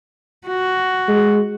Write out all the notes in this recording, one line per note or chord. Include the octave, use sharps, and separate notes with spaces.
F#4
G#3